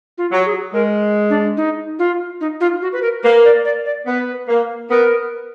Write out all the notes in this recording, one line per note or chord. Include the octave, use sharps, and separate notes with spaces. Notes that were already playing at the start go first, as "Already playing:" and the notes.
F4
F#3
G#4
G#3 A#4
D4
D#4
F4
D#4
F4
F#4
B4
A#4
A#3 B4
D5
D5
D5
B3 B4
A#3
B3 A#4